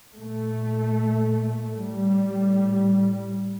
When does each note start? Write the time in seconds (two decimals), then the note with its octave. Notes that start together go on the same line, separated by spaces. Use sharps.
0.19 A#2 A3
1.78 A2 G3